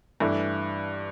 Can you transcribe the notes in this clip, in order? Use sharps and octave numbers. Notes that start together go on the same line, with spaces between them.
G2 E3 A3 E4